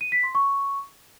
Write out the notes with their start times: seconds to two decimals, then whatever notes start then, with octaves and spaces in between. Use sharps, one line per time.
0.01 D#7
0.12 B6
0.23 C6
0.35 C#6